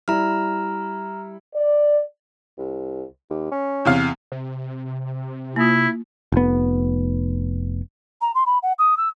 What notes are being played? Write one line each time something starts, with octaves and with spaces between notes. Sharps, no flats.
G3 E4 A#5 F6
D5
C2
D#2
C#4
E2 C3 F5
C3
A#3 E4 F4
F1 B3
A#5
C6
B5
F#5
D#6
E6